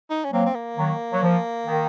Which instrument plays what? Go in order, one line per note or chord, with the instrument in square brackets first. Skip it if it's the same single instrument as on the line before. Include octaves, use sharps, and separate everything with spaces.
[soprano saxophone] D#4
C#4
[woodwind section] F#3 A#3 [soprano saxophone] C4
[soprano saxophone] C4
A#3
[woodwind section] D#3 F#3
F#3
F3
D#3